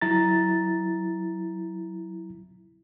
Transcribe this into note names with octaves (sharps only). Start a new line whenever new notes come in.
F#3 E4 A#5 A6